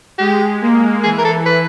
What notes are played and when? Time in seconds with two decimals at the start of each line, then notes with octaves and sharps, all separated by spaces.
0.19 G#3 G4
0.62 A#3
1.04 E3 G#4
1.19 A#4
1.25 A4
1.46 B4